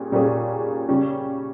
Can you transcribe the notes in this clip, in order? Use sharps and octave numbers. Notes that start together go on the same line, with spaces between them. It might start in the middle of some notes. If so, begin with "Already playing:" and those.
Already playing: A#2 G3 C#4 G#4
A#2 G3 C#4 G#4
C#3 G3 C#4